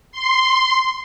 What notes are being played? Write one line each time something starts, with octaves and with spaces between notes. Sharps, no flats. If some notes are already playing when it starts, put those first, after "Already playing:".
C6